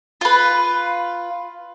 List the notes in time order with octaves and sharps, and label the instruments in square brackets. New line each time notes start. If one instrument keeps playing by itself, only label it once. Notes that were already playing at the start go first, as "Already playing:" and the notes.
[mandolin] F4 B4